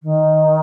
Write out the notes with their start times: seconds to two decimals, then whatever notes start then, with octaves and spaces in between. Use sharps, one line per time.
0.02 D#3